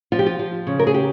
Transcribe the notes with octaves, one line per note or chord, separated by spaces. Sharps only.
F3 F4
G4
F4
F3
C#3
A#4
G#4
G4